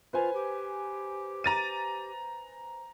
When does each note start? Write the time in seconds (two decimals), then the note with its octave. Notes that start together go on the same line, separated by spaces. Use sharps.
0.13 F4 B4 C5 G#5
0.34 G4
1.44 A#5 A6 D#7